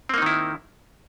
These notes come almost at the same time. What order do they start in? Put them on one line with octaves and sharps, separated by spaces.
C4 A#3 D#4 D#3 E4